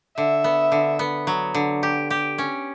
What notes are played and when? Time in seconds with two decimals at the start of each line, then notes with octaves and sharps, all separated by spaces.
0.17 D3 E5
0.44 B3
0.72 D3
0.99 B3
1.27 F#3
1.54 D3
1.83 G4
2.10 G4
2.38 C#4